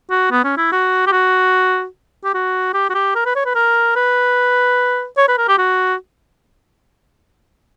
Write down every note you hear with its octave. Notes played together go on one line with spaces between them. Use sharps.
F#4
B3
C#4
E4
F#4
G4
F#4
G4
F#4
G4
F#4
G4
A#4
B4
C#5
B4
A#4
B4
C#5
B4
A#4
G4
F#4